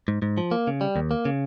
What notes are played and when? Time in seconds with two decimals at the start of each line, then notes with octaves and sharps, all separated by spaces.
0.08 G#2
0.22 G#2
0.38 F3
0.51 A#3
0.67 C#3
0.81 G3
0.96 D#2
1.11 A#3
1.25 C#3